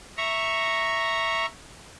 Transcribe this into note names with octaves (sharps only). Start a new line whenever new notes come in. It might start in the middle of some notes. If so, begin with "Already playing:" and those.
E5 A#5 C#6